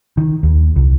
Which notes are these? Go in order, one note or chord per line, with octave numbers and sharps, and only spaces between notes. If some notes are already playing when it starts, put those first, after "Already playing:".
D#3
D#2
C2